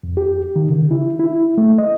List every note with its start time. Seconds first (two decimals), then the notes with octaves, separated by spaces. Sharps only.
0.04 F2
0.17 G4
0.56 D#3
0.69 C#3
0.91 E4
1.19 E4
1.58 A3
1.78 D#5